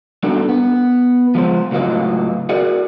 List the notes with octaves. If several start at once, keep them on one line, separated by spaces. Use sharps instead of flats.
G3 B3 D4 D#4 F#4 A4
B3
F3 G#3 C5
C#2 A2 F#3 F4 B4 D#5
F#4 G#4 A#4 D5